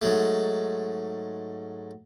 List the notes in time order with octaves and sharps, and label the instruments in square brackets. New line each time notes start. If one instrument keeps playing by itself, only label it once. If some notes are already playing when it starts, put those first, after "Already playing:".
[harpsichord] G#2 F#3 A3